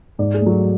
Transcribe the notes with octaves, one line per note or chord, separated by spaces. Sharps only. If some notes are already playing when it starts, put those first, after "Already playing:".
G#2 D5
G#4
A3
F#3 F#4